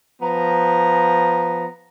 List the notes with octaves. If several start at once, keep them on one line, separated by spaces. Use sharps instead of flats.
F3 B3 A#5